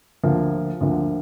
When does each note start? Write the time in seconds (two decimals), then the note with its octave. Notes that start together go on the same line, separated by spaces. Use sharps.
0.23 D2 D3 F3 A#3
0.81 D2 D3 F3 A#3